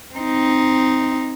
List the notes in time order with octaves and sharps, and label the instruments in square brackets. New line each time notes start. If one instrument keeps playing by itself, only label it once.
[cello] C4 D#4